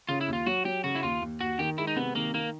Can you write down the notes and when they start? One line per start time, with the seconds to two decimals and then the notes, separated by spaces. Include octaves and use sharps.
0.09 C#3 F4
0.21 E4
0.28 D#2 F4
0.46 F#3 F#4
0.65 F#3 G4
0.84 C#3 F#4
0.96 E4
1.03 D#2 F4
1.21 D#2
1.41 D#2 F#4
1.59 D#3 G4
1.78 G#3 E4
1.87 D#4
1.96 C3 B3
2.15 D#3 A#3
2.34 D#3 A#3